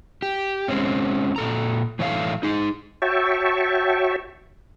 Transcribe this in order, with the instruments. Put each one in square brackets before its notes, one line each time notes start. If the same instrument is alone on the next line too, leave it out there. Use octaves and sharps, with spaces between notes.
[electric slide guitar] G4
G#3 C4 C#4
A#2 A4 A#5
A2 E3 A3 A4 C#5 F5
D#4 G#4
[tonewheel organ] F#4 C#5 E5 G5 A5 C#6